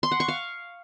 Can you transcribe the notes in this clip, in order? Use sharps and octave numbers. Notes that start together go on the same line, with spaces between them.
C6
F#5
C#6
F5